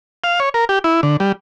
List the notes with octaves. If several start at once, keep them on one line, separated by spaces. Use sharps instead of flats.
F5
C#5
A#4
G4
E4
D3
G3